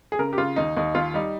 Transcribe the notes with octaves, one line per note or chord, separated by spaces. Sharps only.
G#4
C#3 A#4
G4
C#3 F4
D#2 D#4
D#2 D#4
D#2 F4
G3 D#4